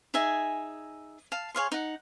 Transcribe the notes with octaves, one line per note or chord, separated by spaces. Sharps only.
D#4 G#4 E5 G#5
F5 A5
G#4 C#5 F5 C6
D#4 F#5